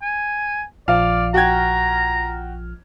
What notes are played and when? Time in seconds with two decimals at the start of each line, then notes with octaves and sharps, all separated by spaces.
0.02 G#5
0.88 A#1 F3 D5 F5 F6
1.34 F#4 G5 A#5 G#6